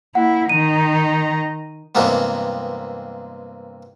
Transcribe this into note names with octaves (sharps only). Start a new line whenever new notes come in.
A#3 E4 F#5
D#3 D#4 D#7
G2 C3 E3 G#3 A#3 B3